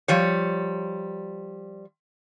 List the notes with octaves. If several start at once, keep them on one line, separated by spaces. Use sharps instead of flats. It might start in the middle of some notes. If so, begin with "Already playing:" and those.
F3 G3 C#5